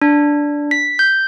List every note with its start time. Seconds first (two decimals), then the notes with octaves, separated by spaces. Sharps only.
0.02 D4
0.71 B6
0.99 G6